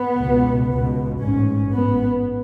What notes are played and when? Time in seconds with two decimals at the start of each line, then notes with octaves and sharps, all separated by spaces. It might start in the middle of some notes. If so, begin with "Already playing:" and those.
Already playing: B3
0.19 C#2 B2
0.70 C#2 B2
1.22 A1 G#2 C#4
1.73 A1 G#2 B3